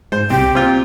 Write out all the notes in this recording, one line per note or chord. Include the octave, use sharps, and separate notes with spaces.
G#2 C5
C2 C4 G4
A#2 C4 F4